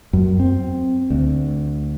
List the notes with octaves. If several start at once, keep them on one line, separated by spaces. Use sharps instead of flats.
F#2
C4
D2